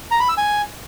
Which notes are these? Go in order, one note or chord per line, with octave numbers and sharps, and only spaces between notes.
A#5
B5
E6
G#5